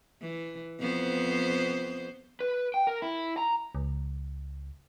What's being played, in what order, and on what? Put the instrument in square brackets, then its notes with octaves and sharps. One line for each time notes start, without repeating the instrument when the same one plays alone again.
[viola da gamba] E3
F2 B3 C5
[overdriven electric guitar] B4
G5
A#4
E4
A#5
[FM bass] C#2